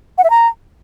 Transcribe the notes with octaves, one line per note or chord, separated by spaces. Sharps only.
F#5
E5
A#5